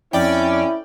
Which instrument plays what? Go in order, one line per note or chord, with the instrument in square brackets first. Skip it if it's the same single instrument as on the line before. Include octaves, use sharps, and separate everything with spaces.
[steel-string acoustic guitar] F2 [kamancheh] C#4 [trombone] E4 [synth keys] D5 G5